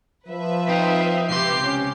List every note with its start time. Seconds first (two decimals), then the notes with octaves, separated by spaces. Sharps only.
0.29 F3 B4 E5
0.69 C4 D#4 F4
1.29 C#2 C3 G4 C6 C7
1.61 C#4